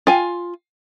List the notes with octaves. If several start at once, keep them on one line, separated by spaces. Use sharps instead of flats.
F4 G#5